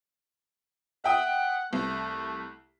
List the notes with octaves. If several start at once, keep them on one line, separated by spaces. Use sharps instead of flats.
E5 F#5 G5 D#6
C2 A3